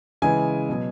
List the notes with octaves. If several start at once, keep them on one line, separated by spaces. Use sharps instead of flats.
C#3 E3 G#3 G#5
B2 F#3